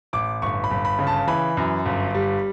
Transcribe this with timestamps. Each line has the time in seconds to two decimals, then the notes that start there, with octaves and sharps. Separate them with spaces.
0.13 A1 D6
0.42 G1 C#6
0.64 B5
0.71 G1
0.85 B5
0.99 C#3
1.07 A5
1.27 E3 B5
1.57 F#2
1.86 G1
2.14 G3